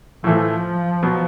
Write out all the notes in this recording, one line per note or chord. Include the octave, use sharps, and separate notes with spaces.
A2 E3 F3 A3
B2 F#3 B3